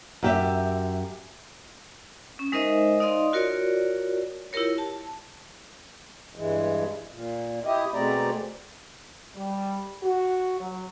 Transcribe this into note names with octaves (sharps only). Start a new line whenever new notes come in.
F#2 G4 E5
C#4
G#3 D#4 A#4 C5 D#5 E5
D#4 D5 D#5 F5 C6
F4 F#4 A#4 C#5 D5
E4 F4 G4 A#4 C#5
A5
G2 E3 G#3
A#2
E4 G4 D#5
B2 G#3 A3 C4 D5 A#5
G3
F#4
F#3